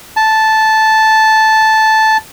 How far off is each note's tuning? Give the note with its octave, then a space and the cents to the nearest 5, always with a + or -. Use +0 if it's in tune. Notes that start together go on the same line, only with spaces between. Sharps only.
A5 -5